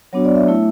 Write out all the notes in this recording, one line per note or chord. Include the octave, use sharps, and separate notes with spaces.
F#3 B3 D4 F#4 C#5
D5
E5
A3 E4